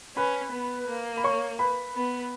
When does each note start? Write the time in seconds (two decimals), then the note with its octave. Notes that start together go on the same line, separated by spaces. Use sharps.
0.16 C#4 B4 B5
0.52 B3
0.88 A#3
1.17 B5
1.24 C#5 C#6
1.59 B4 B5
1.95 B3